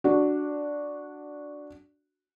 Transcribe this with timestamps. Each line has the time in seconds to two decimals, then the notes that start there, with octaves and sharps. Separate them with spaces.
0.04 D4 F#4